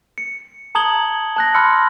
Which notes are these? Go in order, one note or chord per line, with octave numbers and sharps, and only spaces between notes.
C#7
A5 A#5 D#6 G#6 F#7 G7
A5 F#6 A#6
B5 C6 E6 F6 C#7